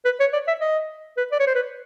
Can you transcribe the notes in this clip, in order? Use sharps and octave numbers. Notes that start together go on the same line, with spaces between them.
B4
C#5
D5
E5
D#5
B4
D5
C#5
C5
B4